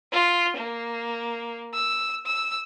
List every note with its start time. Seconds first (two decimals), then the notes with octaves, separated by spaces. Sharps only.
0.13 F4
0.58 A#3
1.74 E6
2.26 E6